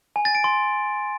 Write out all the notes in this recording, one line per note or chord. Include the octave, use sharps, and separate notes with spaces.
G#5
A6
D7
C6